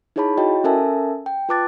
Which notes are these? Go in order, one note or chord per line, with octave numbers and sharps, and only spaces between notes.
D#4 E4 G#4 C#5 A5 B5
E4 F#4 C#5 D#5 G5
C#4 A4 A#4 E5 G#5 A5
G5
F4 B4 A5 D6 F#6 A6